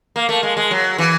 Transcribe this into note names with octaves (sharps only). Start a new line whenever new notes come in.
A#3
A3
G#3
G#3
F#3
E3